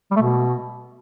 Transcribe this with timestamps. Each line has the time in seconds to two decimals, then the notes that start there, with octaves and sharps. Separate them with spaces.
0.11 G3
0.16 A3
0.22 B2